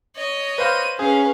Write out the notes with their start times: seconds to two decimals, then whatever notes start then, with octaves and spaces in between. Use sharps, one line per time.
0.16 C#5 D#5
0.58 B4 C5 F5 D#7
0.99 C#4 G#4 B4 F5